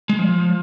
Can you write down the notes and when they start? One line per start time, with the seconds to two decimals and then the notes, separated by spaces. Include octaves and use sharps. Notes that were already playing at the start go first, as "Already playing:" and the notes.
0.09 G#3
0.19 F3